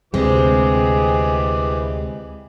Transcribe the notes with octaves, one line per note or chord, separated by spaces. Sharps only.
D2 C3 E3 G3 G#3 C4 G#4 D6